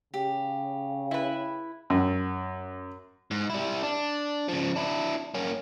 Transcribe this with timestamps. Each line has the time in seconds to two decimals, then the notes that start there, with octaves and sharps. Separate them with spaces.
0.14 C#3 G4
1.11 E4 B4
1.90 F#2
3.31 G#2
3.50 G3 E4
3.83 D4
4.48 C#3 F3
4.76 D4 E4
5.34 A#3 C#4